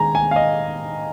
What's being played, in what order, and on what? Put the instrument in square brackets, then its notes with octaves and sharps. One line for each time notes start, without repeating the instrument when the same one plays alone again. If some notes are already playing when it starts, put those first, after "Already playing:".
Already playing: [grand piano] D#3 G#3 G#5 A#5
G#5
F5
D#5